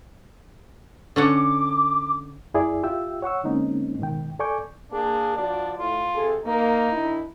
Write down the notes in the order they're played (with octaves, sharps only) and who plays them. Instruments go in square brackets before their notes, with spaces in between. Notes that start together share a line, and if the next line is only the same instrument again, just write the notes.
[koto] D3 C#4 F#5 [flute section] D6
[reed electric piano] F#2 E4 G#4 D5 E5
F4 G4 E5 G5 E6
C#5 F#5 C#6 E6
D3 G#3 A#3 C4 C#4 D#4
G#2 B2 D#3 G5
A4 D5 G#5 C#6 D6 G6
[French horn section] A#3 G#4 [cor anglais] D4
[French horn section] F3 F#4 D5 [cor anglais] D4
[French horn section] A2 [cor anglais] F4
[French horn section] C3 G#4 A4
[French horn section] A#3 [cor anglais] D#4
[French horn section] D#3 D4 E4